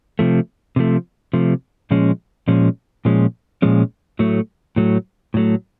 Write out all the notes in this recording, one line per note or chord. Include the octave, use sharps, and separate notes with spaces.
C3 F3 A3
C3 F3 A3
C3 F3 A3
A#2 F3 G#3 C#4
A#2 F3 G#3 C#4
A#2 F3 G#3 C#4
A#2 F3 G#3 C#4
A2 F#3 A3
A2 F#3 A3
A2 F#3 A3